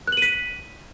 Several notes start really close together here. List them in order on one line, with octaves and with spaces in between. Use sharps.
F#6 F#7 D#7 B6